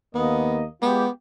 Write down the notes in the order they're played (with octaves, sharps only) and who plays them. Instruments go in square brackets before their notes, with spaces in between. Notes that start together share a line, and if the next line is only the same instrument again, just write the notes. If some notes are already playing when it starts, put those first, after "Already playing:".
[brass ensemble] D#2 A#3 D#5 [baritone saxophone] B3
[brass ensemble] G#3 F4 G4 [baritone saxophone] B3